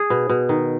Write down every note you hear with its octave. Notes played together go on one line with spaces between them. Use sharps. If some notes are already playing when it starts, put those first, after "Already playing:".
Already playing: G#4
B2
B2
D#3